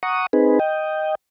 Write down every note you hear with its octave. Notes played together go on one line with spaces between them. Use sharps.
F#5 A#5 C#6 D#6
C4 D#4 G#4 B4
D#5 G5